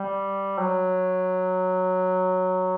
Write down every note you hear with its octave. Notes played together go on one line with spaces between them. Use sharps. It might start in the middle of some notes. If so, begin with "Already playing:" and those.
Already playing: G3
F#3